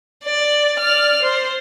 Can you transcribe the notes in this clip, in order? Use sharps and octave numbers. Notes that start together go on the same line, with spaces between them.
D5
D5 F6
C5